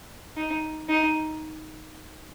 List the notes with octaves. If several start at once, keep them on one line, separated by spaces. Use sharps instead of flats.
D#4
D#4